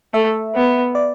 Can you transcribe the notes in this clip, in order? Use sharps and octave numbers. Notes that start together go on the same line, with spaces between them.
A3 E5
B3
D5